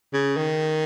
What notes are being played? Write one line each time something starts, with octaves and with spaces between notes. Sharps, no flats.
C#3
D#3